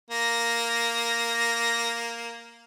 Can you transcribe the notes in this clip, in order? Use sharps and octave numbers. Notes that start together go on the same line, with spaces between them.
A#3 A#6